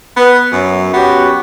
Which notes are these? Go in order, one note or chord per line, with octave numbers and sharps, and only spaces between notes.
B3 B4
F#2
B3 C#4 F#4 G4